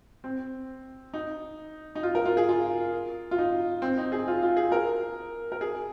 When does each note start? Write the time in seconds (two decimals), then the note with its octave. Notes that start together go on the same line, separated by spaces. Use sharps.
0.24 C4
1.14 D#4
1.95 D#4
2.03 F4
2.15 A#4
2.25 F4
2.37 G#4
2.49 F4
3.31 F4
3.38 D#4
3.82 C4
3.98 D#4
4.12 G#4
4.28 F4
4.43 F4
4.57 G#4
4.72 A#4
5.52 A#4
5.61 G#4